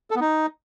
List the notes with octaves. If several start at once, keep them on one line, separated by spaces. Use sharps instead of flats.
A4
B3
D#4